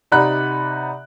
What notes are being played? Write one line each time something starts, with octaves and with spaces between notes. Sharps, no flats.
C3 D#4 D5 F#5 B5 F#6